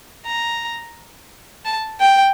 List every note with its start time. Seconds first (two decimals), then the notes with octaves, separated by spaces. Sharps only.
0.26 A#5
1.65 A5
2.00 G5